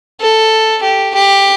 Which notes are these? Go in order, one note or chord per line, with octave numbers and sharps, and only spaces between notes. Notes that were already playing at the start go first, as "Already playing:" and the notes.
A4
G4
G4